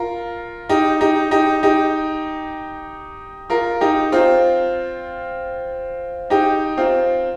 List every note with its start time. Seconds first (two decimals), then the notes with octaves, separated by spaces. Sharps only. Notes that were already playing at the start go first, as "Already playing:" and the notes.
Already playing: F4 A#4
0.69 D#4 G4
1.01 D#4 G4
1.31 D#4 G4
1.63 D#4 G4
3.50 F4 A#4
3.81 D#4 G4
4.12 C4 F4
6.30 D#4 G4
6.77 C4 F4